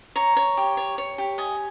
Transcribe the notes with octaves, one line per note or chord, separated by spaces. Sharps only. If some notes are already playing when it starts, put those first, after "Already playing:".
C#5 A#5
C#5
G4
C#5
C#5
G4
D#5 G#5